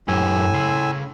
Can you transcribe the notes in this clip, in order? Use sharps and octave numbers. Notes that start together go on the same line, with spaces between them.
F#2 A2 G4 G#5 E6
C#3 C6